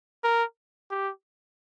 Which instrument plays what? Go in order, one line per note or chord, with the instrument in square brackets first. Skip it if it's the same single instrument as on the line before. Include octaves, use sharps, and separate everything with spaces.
[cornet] A#4
G4